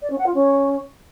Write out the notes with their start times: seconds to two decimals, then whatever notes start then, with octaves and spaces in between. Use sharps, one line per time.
0.02 D5
0.10 C#4
0.18 F#5
0.26 F4
0.34 C#4